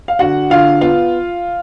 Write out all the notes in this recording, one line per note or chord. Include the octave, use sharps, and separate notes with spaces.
F5
D3 F#4 F#5
D3 F4 F5
B3 F4 F5